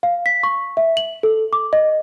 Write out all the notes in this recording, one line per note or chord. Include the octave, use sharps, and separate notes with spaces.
F5
B6
C#6
E5
F#7
A4
D6
D#5